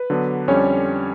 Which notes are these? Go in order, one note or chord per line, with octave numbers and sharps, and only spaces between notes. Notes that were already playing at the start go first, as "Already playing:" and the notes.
Already playing: B4
D3 F#3 B3 D4
F2 D3 G3 C#4 C#5